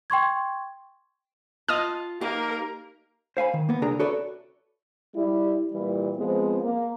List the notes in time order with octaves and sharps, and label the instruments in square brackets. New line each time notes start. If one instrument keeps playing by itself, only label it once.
[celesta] G5 C6 C#6 G#6
[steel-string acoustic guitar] F4 A5 [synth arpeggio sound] D#5 D#6 F6
[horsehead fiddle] A#3 A#4 [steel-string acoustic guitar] D#4 G4
[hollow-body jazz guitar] C5 F5 G#5 B5
D#3
A#3 B3
C2 D3 D4 G#4 A#4 A#5
F#4 A4 B4 C#5 D5 E5
[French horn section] G3 E4
A#2 E3 G3
F3 G#3 B3 C4
A#3